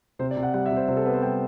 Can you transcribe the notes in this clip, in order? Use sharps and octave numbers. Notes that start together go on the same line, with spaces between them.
C3 C5
D5
C3
F#5
G3 F#5
E5
C3
C5
C3 C5
A4
B3 B4
C5
G3 G5